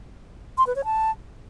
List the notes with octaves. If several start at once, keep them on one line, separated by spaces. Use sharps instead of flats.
C6
B4
C#5
A5